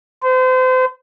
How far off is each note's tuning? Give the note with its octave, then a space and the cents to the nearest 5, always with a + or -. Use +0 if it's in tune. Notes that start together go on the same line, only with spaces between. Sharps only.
C5 -35